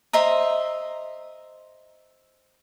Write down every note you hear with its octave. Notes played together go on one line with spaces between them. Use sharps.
C5 D#5 E5 A#5